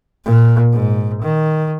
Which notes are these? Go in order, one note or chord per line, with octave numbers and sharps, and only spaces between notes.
A#2
G#2
D#3